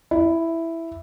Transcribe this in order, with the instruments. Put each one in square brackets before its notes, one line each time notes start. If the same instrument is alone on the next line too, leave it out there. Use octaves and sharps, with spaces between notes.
[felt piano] E4